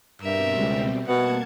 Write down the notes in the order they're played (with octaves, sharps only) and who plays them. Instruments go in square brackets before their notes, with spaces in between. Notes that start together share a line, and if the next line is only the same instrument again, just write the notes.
[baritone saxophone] G2 [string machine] B2 G3 C4 [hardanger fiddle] A#4 E5
[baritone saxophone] C#2
[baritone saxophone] B2 [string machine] A#3 A5 G#6 [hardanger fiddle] F#5